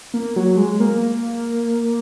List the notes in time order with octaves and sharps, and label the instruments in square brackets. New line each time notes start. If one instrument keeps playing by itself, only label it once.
[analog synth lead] A#3
F#3
G#3
A#3